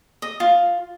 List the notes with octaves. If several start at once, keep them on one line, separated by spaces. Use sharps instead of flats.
D#5
F4